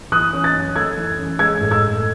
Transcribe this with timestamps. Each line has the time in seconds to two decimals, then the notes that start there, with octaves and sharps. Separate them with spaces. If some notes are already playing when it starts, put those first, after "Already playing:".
0.12 E3 D#6 F#6
0.33 C#4
0.44 F#6 A6
0.54 F#2
0.76 A3 E6 G#6
0.97 E3
1.18 C#4
1.39 G#3 E6 G#6
1.61 A2
1.71 E6 G#6
1.82 A2